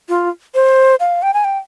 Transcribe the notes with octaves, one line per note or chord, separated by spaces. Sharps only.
F4
C5
F5
G5
G#5
G5